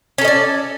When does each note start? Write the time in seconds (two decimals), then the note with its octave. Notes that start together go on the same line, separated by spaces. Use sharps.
0.18 C#4
0.21 A4
0.25 D#5
0.28 D5